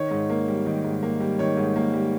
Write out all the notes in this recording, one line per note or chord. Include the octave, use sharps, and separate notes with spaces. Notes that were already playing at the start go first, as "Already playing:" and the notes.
Already playing: D#3 C#5
G#2
A#3
G3
D#3
G#2
A#3
G3
D#3 C#5
G#2
A#3
G3